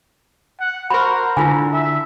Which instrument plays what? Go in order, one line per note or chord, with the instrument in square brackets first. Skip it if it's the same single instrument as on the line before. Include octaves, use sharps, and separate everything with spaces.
[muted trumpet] F#5
[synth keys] F#4 A#4 [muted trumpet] C5 [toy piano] B5
[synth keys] D3 [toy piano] E4 F4 G#5 [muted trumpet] A4
[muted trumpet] E5